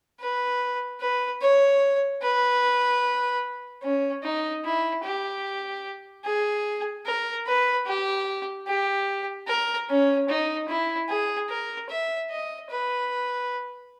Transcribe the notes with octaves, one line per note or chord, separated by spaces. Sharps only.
B4
B4
C#5
B4
C#4
D#4
E4
G4
G#4
A#4
B4
G4
G4
A#4
C#4
D#4
E4
G#4
A#4
E5
D#5
B4